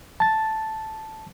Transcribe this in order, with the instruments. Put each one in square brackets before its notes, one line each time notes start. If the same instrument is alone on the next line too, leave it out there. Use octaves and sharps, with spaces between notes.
[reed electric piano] A5 A6